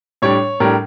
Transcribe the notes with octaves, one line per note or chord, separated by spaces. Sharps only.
A2 G3 D4 C#5
A2 G3 D4 A#4